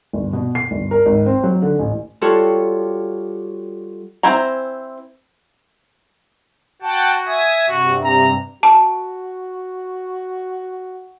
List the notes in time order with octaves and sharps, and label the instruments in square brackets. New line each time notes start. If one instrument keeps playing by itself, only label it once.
[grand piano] G1
B2
C7
G1
A#4
G#1
C4
F#3
D3
A1
[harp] G3 F4 F#4 A4 C#5
[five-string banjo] C4 E4 C5 G#5 A#5
[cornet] F#4 [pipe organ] F#5 G5 A5
[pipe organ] E5 G#5 D#6
[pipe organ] G2 C3 [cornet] F#4
[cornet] A#5
[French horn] F#4 [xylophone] A5